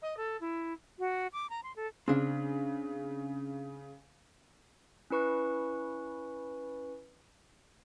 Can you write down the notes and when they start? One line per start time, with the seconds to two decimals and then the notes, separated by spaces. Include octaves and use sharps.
0.02 D#5
0.17 A4
0.40 E4
0.99 F#4
1.33 D6
1.50 A#5
1.64 C6
1.76 A4
2.08 C#3 C4 D4 F5
5.10 C#4 E4 B4 C#6